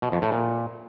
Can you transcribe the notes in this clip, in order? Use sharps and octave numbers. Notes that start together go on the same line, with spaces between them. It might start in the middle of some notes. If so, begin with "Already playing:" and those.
B2
F2
A2
A#2